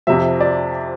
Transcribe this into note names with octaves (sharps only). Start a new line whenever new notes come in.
F2 C3 F3 E5
D5